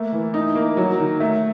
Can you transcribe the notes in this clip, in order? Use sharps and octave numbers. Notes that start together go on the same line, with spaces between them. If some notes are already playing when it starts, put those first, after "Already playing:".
Already playing: A3 A#3
E3
D#4
A#3
F#3
D#3
A3